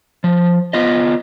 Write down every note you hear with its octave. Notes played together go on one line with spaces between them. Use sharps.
F3
B3 F4 D#5